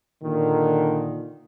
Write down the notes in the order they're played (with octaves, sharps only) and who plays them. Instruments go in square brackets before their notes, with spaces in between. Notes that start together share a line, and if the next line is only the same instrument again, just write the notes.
[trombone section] A#2 D3 D#3